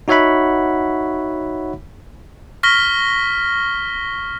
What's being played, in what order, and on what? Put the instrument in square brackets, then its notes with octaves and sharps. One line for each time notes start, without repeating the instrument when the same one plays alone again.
[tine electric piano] D#4 F#4 C#5 E5 F#5 B5
[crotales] C#6 F6 A#6 B6 G7